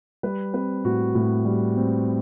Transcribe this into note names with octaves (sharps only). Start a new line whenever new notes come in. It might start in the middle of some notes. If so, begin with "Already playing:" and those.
G3 B4
C4 B4
A2 F#4
A2
G3
C4